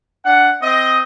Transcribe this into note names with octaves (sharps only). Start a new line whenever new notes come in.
D4 F#5
C4 D#5